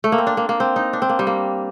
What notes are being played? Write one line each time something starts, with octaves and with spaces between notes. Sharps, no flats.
A3
A#3
C4
D4
A#3
A#3
C4
D#4
D4
C4
A#3
G3
A#3